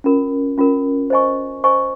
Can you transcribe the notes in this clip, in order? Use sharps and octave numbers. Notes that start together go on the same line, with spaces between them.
C#4 F4 A#4
C#4 F4 A#4
C5 D#5 G#5 C#6
C5 D#5 G#5 C#6